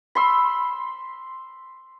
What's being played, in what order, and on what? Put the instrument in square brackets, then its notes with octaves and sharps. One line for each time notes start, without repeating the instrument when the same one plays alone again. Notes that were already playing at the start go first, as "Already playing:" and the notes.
[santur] B5 C6 E6